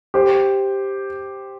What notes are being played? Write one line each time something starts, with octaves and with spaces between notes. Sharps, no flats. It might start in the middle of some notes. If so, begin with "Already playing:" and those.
G4 C5